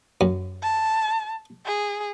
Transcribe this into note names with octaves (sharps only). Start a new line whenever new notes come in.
F#2
A5
G#4